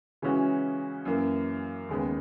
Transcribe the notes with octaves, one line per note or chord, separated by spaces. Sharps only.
C#3 E3 G#3 C#4 F#4
F#2 E3 A#3
D#2 C#3 G#3 B3